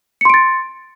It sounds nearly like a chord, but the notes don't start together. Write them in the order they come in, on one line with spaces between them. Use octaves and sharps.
C#7 C6 D7 A6